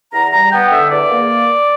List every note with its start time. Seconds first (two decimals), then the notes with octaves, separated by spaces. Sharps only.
0.13 E2 A#5
0.32 G3 A#5
0.51 B3 G5
0.71 D3 E5
0.90 E2 D5
1.09 A#3